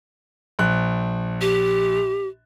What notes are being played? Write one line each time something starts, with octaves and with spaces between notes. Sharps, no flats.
A#1 F#6
G4